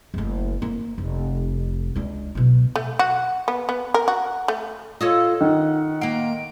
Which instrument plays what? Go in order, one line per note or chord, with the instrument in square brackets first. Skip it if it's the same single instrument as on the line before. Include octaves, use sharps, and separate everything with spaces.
[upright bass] F#1 A3
A#3
F1
C#2 D4
B2 F#3
[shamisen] A3
F#4
B3
B3
A#4
F#4
A3
[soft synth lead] F4 [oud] A4 C#5 D#5
[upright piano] D#3 [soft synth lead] F#5
[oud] A#3 F4 [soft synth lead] D7